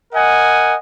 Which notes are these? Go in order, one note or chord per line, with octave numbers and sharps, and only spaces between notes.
A#4 D#5 F#5 G#5